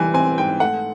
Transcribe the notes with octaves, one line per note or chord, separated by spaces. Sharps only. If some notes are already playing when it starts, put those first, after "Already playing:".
Already playing: E3 G3 G#5
C4 G#5
G#2 G5
A3 F#5